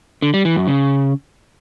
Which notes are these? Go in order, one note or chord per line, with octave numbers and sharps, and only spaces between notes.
D3
G3
E3
F#2
C#3